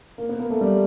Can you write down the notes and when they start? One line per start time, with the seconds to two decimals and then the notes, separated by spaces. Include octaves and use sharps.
0.18 A#3
0.29 B3
0.39 A#3
0.50 A3
0.61 G3